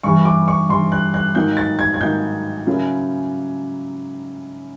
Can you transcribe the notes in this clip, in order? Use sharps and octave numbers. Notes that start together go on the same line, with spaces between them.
G2 E3 G3 C#6
D6
C#6
G2 E3 G3 C6
F#6
F#6
G#2 D#3 F#3 A#3 D#4 G6
A6
G#6
G#6
G#2 D#3 F#3 A#3 D#4 G6
C#3 F#3 A#3 C#4 E4